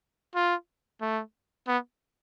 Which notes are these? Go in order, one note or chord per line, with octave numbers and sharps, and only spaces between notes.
F4
A3
B3